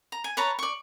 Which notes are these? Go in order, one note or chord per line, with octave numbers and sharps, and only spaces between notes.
A#5
G#5
B4 C#5 A5 A#5
D5 C#6